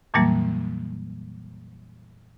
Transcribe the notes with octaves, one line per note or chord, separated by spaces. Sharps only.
F2 A#2 E3 F#3 G3 A#3